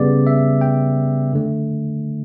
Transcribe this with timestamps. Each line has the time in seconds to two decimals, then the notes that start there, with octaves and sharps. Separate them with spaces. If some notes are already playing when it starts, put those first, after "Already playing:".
Already playing: C#3 G3 B3 D5
0.27 E5
0.61 G5
1.33 D3 A3